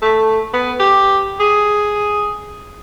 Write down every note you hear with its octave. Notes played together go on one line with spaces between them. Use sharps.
A3
B3
G4
G#4